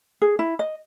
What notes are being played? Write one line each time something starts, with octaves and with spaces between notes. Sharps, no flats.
G#4
E4
D#5